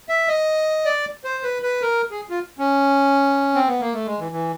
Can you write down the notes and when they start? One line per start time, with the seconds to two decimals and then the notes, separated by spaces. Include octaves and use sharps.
0.09 E5
0.28 D#5
0.85 D5
1.24 C5
1.43 B4
1.63 B4
1.82 A#4
2.11 G#4
2.29 F4
2.58 C#4
3.55 C4
3.67 B3
3.80 A#3
3.93 A3
4.06 G#3
4.19 E3
4.32 E3